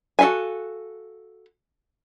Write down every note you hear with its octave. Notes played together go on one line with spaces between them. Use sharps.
F#4 A4 E5 F5 G#5